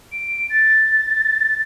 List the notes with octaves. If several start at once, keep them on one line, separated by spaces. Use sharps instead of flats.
D7
A6